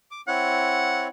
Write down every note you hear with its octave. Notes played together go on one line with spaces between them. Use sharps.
D6
C4 E4 C#5 F#5